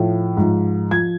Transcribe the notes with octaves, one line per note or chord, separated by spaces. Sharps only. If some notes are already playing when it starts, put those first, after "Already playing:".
Already playing: A2 F3
G#2 F3
F3 G#6